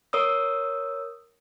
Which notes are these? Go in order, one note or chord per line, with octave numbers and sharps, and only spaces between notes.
A#4 C#5 D#6 E6